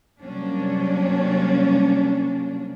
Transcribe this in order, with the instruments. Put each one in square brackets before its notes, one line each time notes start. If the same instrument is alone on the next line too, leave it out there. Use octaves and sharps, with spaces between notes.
[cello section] C3 F#3 G3 A#3 C#4 D4